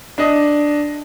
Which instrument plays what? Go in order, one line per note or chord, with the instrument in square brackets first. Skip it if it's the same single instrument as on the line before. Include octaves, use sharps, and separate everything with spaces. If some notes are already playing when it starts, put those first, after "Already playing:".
[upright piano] D4 D#5